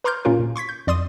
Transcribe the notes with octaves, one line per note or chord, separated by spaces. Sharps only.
B4 A#5 C6 D6 F6 G6
A#2 C#4 F4 A#4
A#2
C6 C#6 G#6 B6
G6
F2 D5 C6 D#6 D#7